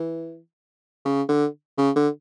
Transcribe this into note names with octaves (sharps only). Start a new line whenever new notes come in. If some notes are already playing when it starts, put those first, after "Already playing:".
Already playing: E3
C#3
D3
C#3
D3